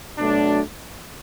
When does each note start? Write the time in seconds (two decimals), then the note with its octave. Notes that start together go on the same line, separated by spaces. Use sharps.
0.18 B2 F#3 A3 D4